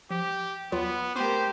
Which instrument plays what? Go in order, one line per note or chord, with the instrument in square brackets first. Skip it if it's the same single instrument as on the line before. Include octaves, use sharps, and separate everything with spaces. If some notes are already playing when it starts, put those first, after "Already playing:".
[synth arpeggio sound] F3 [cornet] G4
[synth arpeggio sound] D#2 F#3 F4 [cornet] B3
[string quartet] A3 G4 A#4 [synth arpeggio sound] B3 C#6 D#7 [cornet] C5